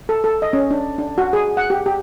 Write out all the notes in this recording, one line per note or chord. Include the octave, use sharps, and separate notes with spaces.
A4
A4
D#5
C#4
D4
D4
F#4
G#4
F#5
G4
G4